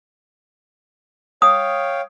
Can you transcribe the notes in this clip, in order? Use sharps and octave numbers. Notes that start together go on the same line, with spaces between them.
C#5 F5 G5 D#6